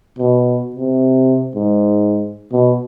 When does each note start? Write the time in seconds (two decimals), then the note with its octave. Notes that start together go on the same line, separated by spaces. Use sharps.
0.18 B2
0.76 C3
1.55 G#2
2.52 B2